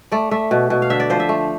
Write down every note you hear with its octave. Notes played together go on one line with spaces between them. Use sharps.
A3 D5
A3 E5
B2
B2
F5
D3 E5
D5
F3 C5
E5
A3